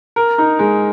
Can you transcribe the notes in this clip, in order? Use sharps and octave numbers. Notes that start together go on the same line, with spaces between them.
A#4
D#4
G#3